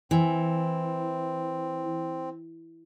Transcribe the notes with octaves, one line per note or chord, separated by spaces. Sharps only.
E3 C4